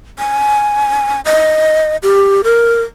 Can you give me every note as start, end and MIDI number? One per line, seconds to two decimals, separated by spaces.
0.19 1.20 80
1.25 1.96 75
2.03 2.42 67
2.44 2.82 70